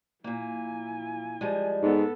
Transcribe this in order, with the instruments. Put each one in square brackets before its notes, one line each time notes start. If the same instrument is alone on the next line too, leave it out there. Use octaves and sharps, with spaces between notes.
[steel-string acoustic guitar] A#2 A#3 [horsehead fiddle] E4 G#5
[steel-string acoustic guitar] F3 G3 G#3
[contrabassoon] G#2 [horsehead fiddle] B3 A4